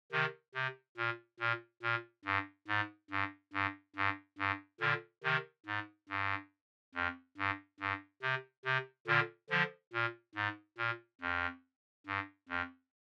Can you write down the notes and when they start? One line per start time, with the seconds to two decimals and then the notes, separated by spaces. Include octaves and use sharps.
0.12 C3 D#3
0.54 C3
0.97 A#2
1.40 A#2
1.83 A#2
2.25 G2
2.68 G#2
3.10 G2
3.53 G2
3.96 G2
4.38 G2
4.80 A#2 D3
5.24 C3 D#3
5.66 G#2
6.09 G2
6.95 F2
7.37 G2
7.80 G2
8.22 C3
8.65 C3
9.07 A#2 D3
9.50 D3 F3
9.93 A#2
10.35 G#2
10.78 A#2
11.21 F2
12.06 G2
12.49 F2